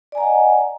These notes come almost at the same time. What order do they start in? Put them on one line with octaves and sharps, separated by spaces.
D5 G#5 A#5 F#5 D#5